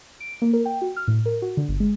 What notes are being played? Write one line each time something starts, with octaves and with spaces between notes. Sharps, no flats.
D7
A#3
A#4
G5
F#4
F6
A2
A#4
F#4
D3
G1
G#3